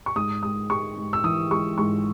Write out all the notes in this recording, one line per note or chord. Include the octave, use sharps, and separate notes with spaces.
C#6
G#2 D#6
G#3 D#6
G#3 C#6
G#2
E6
E3 D#6
G#3 C#6
G#2 C#6